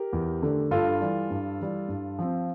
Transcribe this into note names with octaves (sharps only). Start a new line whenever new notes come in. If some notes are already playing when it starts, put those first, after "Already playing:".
Already playing: G4 A#4
E2
D3 A3
G2 F4 A4
E3 G3
G2
E3 G3
G2
F3 C4